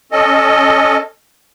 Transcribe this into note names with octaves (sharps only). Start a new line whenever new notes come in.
C#4 A4 D#5